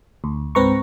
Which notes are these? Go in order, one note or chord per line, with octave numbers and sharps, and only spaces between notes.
D2
C#2 G#2 C4 B4 A#5 C#6